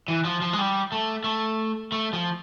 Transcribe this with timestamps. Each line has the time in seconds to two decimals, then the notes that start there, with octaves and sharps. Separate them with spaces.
0.08 E3
0.25 F3
0.41 F3
0.53 G#3
0.58 G3
0.92 A3
1.24 A3
1.92 A3
2.13 F3